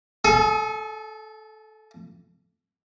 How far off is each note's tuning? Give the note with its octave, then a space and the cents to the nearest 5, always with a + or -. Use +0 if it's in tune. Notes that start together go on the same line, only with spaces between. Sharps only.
A4 -15 G#5 +30 D#6 +30